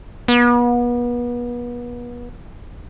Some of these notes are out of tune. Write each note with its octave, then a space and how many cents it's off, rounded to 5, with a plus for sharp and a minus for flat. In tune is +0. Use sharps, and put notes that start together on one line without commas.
B3 -35